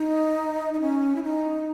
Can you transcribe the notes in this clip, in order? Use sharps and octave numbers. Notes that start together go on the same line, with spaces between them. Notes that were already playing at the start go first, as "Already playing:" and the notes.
Already playing: D#4
D#4
C#4
E4
D#4